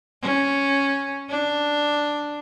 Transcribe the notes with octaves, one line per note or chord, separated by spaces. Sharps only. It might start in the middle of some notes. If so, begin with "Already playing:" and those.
C#4
D4